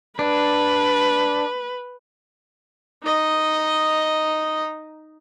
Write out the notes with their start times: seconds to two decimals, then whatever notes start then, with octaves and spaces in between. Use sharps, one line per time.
0.19 D4 B4
3.03 D#4 D#5